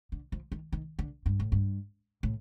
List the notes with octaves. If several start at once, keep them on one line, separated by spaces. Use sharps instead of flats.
D3
F3
D#3
D#3
D3
G2
A2
G2
A2